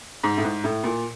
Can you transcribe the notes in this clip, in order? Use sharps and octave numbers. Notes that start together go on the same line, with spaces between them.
G#2
A2
G#2
A2
A#2